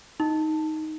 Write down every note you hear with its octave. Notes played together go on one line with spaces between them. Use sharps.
D#4